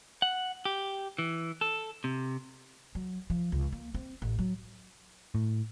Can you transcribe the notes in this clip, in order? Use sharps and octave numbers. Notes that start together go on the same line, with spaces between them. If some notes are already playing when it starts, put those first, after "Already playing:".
F#5
G4
E3
A4
C3
F#3
F3
C#2
A#3
C4
A1
F#3
A2